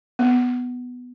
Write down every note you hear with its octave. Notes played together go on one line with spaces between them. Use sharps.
B3